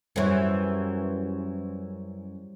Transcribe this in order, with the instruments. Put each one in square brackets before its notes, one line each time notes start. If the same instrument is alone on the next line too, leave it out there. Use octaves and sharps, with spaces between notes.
[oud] F#2 E3 [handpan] G3 C5 C#5